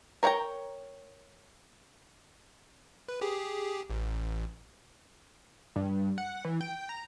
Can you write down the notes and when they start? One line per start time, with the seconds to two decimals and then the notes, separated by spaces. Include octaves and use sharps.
0.23 A#4 C#5 F5 G5 A#5
3.08 B4
3.21 G4 G#4
3.90 A1
5.76 G2
6.18 F#5
6.45 E3
6.61 G5
6.89 A#5